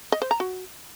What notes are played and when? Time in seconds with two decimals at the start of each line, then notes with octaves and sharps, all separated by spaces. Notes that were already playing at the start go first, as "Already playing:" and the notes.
0.12 D#5
0.22 C5
0.31 A#5
0.40 F#4